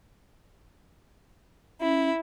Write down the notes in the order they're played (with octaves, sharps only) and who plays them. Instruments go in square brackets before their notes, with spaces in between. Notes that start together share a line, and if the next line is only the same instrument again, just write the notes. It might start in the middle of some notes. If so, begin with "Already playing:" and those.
[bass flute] C#4 [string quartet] E4